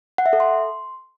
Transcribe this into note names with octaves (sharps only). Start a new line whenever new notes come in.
F#5
E5
A4
C6